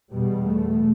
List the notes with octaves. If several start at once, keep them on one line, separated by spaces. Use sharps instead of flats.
E2 B2 G3
A3